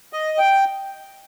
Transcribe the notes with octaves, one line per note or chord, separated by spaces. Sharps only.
D#5
G5